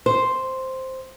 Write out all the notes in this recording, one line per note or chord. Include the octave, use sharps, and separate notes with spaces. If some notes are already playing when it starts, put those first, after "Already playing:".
C5